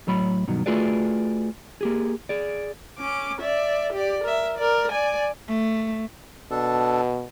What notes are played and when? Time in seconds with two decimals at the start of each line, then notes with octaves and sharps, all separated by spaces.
0.07 A2 F#3 C#5 B5
0.47 G2 B2 D#3 F#3
0.66 A3 F4 F#4 G#4 B4 D5
1.81 A#3 G4 G#4
2.29 G#4 D5
2.98 C#4 D6
3.41 D5 E5
3.93 G4 D5
4.24 A#4 E5
4.58 A#4 D5
4.91 D5 G#5
5.48 A3
6.51 B2 D4 A4